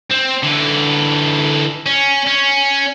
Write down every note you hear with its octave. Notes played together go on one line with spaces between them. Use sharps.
C4
D3 E3
C#4
C#4